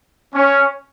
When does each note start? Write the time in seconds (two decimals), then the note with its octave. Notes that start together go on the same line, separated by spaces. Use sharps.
0.34 C#4